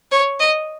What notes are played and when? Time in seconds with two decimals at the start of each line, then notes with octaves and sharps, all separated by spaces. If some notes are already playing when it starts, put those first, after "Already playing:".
0.12 C#5
0.40 D#5